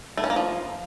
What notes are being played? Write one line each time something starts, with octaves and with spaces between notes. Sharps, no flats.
A3
C#4
A#3
F3